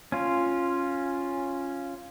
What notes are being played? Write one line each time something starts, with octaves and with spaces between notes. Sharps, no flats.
C#4 F4